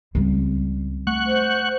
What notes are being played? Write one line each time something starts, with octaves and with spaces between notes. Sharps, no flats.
C#2 G3 C4
A3 F#5 C#6 F#6
C5